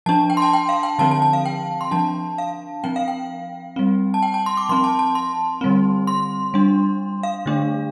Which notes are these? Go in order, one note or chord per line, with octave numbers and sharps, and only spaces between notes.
F3 D4 A5
G5
C6
A5
G5
F5
G5
D3 F3 C4 A5
A5
A5
F5
G5
C6
F3 D4 A5
F5
F3 C4 G5
F5
G5
G3 C4
A5
G5
A5
C6
D6
F3 C4 C6
A5
A5
C6
D3 G3 C4
C6
G3 D4
F5
D3 A3 D4